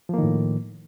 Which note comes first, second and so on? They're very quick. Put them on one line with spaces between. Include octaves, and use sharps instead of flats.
F3 A#3 D#3 A2